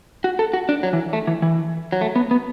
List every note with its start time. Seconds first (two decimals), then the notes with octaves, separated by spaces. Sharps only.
0.24 F#4
0.39 A4
0.53 F#4
0.69 D4
0.83 F#3
0.93 E3
1.13 A3
1.27 E3
1.42 E3
1.92 F#3
2.01 A3
2.16 B3
2.31 B3